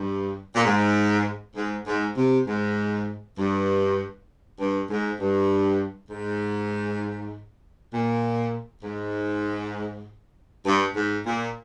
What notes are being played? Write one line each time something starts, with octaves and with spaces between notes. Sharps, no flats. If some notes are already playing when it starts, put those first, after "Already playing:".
Already playing: G2
A#2
G#2
G#2
G#2
C3
G#2
G2
G2
G#2
G2
G#2
A#2
G#2
G2
G#2
A#2